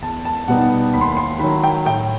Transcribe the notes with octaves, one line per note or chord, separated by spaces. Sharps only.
E2 A5
A5
B2 G3 B3 D#4 F#5
D#2 B5
C6
B5
C6
D#3 F#3 B5
G5
A2 G5